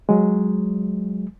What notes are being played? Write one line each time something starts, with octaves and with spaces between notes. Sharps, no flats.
F#3 G#3